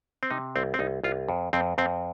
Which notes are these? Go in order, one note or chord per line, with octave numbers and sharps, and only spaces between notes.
C4
C3 D#4
C2 C4
C4
C2 D#4
C2 F4
F2
F2 C4
F2 C4